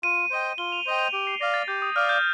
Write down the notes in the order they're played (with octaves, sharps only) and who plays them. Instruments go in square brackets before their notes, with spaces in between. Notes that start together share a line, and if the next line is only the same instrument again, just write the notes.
[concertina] F4 [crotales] D#7
[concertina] C5 D#5 G5
[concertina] F4 [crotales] G7
[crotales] F7
[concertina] C5 D#5 G5 [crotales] F7
[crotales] F7
[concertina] G4 [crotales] D7
[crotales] C7
[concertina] D5 F5 [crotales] A#6
[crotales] A6
[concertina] G4 [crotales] G6
[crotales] D#6
[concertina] D5 F5 [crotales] F6
[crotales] G6